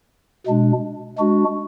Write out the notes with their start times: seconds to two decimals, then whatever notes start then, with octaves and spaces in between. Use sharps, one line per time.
0.46 B2 G#3 D4
1.18 G#3 D4 F#4